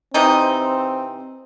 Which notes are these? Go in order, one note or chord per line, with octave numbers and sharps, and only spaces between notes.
C3 E3 C4 D#4